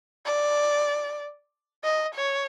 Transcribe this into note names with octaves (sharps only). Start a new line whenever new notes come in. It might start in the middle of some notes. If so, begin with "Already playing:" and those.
D5
D#5
C#5